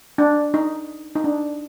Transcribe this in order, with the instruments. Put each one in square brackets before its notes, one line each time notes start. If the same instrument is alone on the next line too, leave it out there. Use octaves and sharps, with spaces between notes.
[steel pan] D4
D#4
D#4
D4